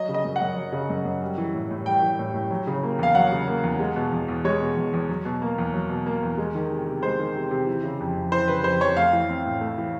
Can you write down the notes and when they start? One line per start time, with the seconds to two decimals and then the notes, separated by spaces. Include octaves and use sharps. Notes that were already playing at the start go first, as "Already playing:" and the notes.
Already playing: F#3 D#5
0.09 C#3
0.14 D#5
0.25 F#2
0.36 F#5
0.41 F#2
0.56 F#3
0.72 C#3
0.90 F#2
1.05 F#2
1.22 G3
1.38 E3
1.54 A2
1.70 A2
1.86 G3 G5
2.02 E3
2.19 A2
2.34 A2
2.51 F#3
2.67 C#3
2.83 A#3
2.99 E2 F5
3.15 F#3 F#5
3.32 C#3
3.48 A#3
3.63 E2
3.79 G#3
3.96 B2
4.12 E2
4.28 E2
4.44 G#3 C#5
4.61 B2
4.77 E2
4.93 E2
5.09 F#3
5.25 B2
5.42 A#3
5.58 E2
5.74 F#3
5.89 B2
6.06 A#3
6.22 E2
6.38 G#3
6.55 D#3
6.70 C3
6.87 C3
7.02 G#3 C5
7.19 D#3
7.35 C3
7.51 C3
7.67 E3
7.83 C#3
8.00 F2
8.16 F2
8.32 E3 C5
8.48 C#3 B4
8.64 F2 C5
8.81 F2 C#5
8.97 A3 F5
9.13 E3
9.29 C4
9.45 A2
9.61 A3
9.78 E3